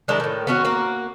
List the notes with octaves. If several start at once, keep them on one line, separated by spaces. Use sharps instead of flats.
D#3 G#3 D4 E4
A2 D#3
B3 C#4 F#4
A#3 F#4